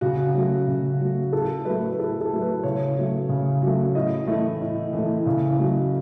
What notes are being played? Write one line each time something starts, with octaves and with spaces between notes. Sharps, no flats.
C#3 F#4
F#3 A3
C#3
F#3 A3
A2 A4
F#3 A3 B4
B4
A2 A4
A4
F#3 A3
B4
C#3 C#5
F#3 A3
C#3
F#3 A3
A2 D#5
E3 A3
A2
E3 A3
C#3
F#3 A3